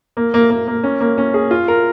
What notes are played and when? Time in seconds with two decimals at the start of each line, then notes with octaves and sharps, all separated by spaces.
0.17 A#3
0.34 A#3
0.50 A#3
0.68 A#3
0.84 C#4
1.01 A#3
1.18 C#4
1.34 G#4
1.51 F4
1.68 A#4